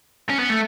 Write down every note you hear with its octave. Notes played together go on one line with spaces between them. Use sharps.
C#4
B3
A3